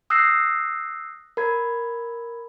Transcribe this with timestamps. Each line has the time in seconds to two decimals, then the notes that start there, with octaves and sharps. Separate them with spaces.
0.10 D#6 E6 F#6 G6 A#6 C7
1.37 A#4 B5 G#6